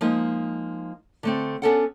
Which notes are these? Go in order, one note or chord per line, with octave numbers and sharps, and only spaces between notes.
F3 G#3 A#3 D#4
D3 A3 C4
B3 C#4 D4 A4 A#4 F#5